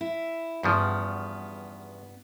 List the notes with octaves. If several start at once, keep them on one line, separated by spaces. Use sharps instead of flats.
E4
E2 G2 C#3 F3 B3